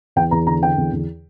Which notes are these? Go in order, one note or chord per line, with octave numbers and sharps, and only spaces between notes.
E2 G5
E2 A#5
D3 A#5
D3 G5
E2
E2